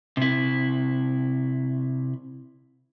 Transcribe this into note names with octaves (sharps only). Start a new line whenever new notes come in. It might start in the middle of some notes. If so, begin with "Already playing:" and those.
C3 E4